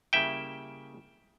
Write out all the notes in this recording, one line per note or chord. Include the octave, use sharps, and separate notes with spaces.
C#3 G3 A#3 E4 E5 G5